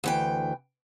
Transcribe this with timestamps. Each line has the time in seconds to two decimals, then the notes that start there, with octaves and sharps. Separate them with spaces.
0.04 D2 E3 G5